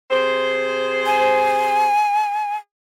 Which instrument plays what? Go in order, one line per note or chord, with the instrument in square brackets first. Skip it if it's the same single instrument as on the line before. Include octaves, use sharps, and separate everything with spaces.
[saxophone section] C3 G#4 C5
[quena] G#5